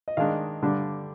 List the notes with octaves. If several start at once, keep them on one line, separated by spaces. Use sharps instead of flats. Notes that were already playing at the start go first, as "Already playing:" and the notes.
D#5
D#3 G#3 D4 F5
G2 D3 G3 D4